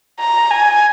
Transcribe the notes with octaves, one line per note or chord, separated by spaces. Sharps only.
A#5
G#5